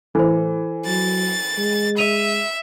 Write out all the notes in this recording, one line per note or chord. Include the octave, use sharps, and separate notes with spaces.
A2 E3 A4 C5
F#3 A6
G#3
E5 D#7 F7